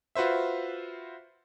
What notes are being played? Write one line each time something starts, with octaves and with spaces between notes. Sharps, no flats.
F4 F#4 B4 C5 E5